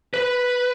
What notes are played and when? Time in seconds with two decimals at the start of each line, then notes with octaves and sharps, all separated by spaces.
0.14 B4